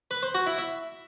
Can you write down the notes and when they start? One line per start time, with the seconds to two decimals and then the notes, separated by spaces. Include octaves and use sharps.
0.11 B4
0.23 C5
0.35 F#4
0.46 E4
0.58 E5